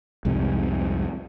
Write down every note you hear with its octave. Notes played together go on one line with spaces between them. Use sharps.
C2 F2 G#2 C3